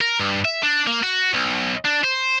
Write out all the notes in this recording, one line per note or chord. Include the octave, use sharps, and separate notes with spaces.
A#4
G2
E5
D4
A#3
F#4
B1
D4
C5